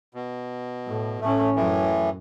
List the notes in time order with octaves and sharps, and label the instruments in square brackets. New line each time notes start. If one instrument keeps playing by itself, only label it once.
[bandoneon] B2
[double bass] A2
[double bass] A2 C#4 [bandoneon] A3
[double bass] F#2 [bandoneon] A2 E3